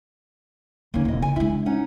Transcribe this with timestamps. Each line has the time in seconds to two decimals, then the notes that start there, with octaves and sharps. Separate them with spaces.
0.94 D#2 D3 A#3 C#4
1.05 E1 D2 D#5
1.22 C#3 G#5
1.36 G#3 D4 E4
1.66 C#4 D#4 F#5